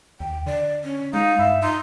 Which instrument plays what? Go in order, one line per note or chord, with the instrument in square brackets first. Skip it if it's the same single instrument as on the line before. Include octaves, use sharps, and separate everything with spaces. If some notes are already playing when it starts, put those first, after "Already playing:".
[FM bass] D#2 [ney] G5
[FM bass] D3 [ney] D5
[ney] C#4
[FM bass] G#3 [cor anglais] D#4 [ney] F5
[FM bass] G2 [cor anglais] E5
[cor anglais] D#4 [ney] C6